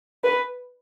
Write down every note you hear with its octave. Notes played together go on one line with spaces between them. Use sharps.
B4